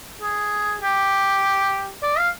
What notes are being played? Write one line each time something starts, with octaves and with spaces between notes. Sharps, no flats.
G#4
G4
D5
F5